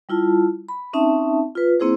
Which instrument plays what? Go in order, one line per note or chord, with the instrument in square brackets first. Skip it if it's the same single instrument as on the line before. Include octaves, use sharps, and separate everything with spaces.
[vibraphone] G3 E4 F4 A5
B5
C4 C#4 D#4 E5 A5
F4 B4
A#3 C4 E4 G#4 C5